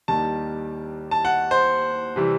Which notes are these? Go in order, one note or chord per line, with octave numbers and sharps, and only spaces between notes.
D#2 D#3 G3 A5
A5
F#5
C5
C3 E3 G3